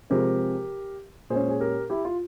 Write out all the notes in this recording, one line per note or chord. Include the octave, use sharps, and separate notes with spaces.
C3 F3 G#3 C4 G4 A#4
A#2 G#3 C#4 G#4 C5
G#4
G4 A#4
E4 G4
F4